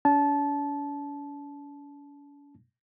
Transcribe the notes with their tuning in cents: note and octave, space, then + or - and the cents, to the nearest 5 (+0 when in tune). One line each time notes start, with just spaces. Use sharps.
C#4 +45 A5 -20